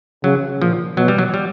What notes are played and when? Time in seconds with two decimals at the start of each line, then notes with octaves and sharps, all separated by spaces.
0.24 C#3 F#3
0.61 A#2 F3
0.97 B2 F#3
1.08 G3
1.18 F#3
1.34 G3